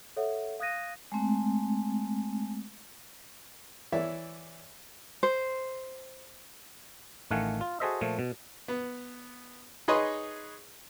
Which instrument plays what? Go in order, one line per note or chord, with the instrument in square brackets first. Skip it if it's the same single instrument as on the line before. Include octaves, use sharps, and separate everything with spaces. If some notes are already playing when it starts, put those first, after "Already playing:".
[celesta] A4 C#5 E5 F#5
F5 D#6 F#6 G#6 A#6 D#7
[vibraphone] G#3 A3 C4
[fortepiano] E3 C#5 D5 E5
[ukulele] C5
[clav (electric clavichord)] A1 D#3 A3 F5 F#5 G#5
F4
F#4 G#4 A4 C5 D#5 E5
A#2 F3 A3
B2
[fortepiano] B3
D#4 G#4 B4 C#5 D#5 C6